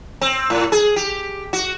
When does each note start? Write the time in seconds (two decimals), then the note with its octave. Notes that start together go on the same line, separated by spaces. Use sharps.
0.21 C4
0.50 A2
0.72 G#4
0.96 G4
1.53 F#4